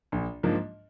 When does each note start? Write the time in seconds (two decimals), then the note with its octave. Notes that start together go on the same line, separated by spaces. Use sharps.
0.12 A#1
0.43 G#2 F3 A#3 D4